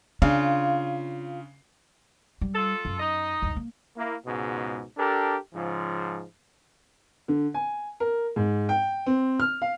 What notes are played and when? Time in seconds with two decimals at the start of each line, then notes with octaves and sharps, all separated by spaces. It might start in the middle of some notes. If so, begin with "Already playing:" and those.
0.22 C#3 D4 F4
2.41 G3
2.55 F4 A4
2.85 F#2
3.00 D#4 D#5
3.42 D2 G2
3.56 A#3
3.97 A#3 E4
4.26 C#2 G#2 B2
4.98 D4 G4 A4 A#4
5.54 G#2 C#3 F3
7.28 D3
7.54 G#5
8.00 A#4
8.36 G#2
8.69 G5
9.06 C4
9.40 F6
9.62 F5